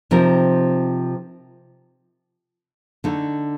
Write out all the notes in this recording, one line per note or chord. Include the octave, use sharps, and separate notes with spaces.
C3 F3 C4 D#4 A#4
D3 A3 D#4